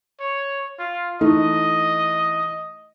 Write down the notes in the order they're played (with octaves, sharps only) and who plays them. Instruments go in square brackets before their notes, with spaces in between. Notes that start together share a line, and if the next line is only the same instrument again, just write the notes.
[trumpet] C#5
F4
[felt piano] E3 A3 D#4 [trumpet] D#5